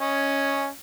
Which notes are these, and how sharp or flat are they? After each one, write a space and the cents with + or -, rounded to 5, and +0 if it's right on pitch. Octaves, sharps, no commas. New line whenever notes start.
C#4 +0 D#5 +15